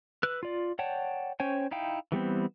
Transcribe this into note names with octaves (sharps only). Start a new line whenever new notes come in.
B4 E6 F#6
F4 D5
C#5 D5 F#5 G5 A5
C#4 C5 C#5 G5 G#5
D#4 E4 F5 G5
E3 G3 B3 C4